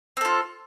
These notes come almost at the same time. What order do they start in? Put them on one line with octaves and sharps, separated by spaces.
C4 A4 F4